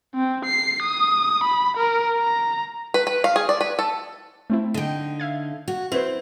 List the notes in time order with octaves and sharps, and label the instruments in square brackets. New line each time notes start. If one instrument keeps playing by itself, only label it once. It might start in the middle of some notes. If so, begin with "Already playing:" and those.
[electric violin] C4
C7
D#6
B5
A#4
A#5
[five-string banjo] B4
B4
F5
G#4
D5
B4
A4
[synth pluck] A3 C4 E4
[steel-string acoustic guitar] D3 D#4 [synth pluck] D#5 G5
[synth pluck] E5 F5 G#6
[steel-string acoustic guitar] F#4
[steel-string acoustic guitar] C4 [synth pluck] E4 B4 C5